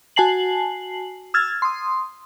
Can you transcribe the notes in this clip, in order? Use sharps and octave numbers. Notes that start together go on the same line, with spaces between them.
F#4 G#5 A5 C7 F#7
E6 F6 G#6 A6
C6 D#6